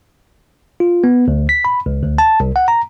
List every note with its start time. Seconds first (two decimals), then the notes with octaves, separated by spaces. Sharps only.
0.80 F4
1.04 B3
1.28 D2
1.49 B6
1.65 B5
1.86 C#2
2.03 D2
2.18 A5
2.40 C2
2.56 F#5
2.68 A#5